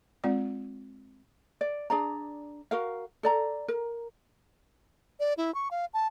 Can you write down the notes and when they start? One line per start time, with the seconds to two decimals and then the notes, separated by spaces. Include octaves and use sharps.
0.24 G#3 C4 F4 D5
1.61 D5
1.90 D4 G#4 D5 A#5
2.71 F#4 A#4 F5
3.23 A4 D5 A#5
3.68 A#4
5.20 D5
5.37 E4
5.55 C#6
5.71 F5
5.94 A5